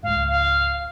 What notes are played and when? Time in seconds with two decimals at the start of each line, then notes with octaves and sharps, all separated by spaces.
0.03 C#2 G#2 F5
0.29 F5